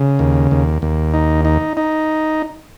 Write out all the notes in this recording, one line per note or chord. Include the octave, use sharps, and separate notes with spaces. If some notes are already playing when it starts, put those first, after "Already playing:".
Already playing: C#3
D#2
D#2
D#2
D#4
D#4
D#4